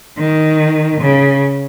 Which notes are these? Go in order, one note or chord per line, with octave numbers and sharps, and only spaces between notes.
D#3
C#3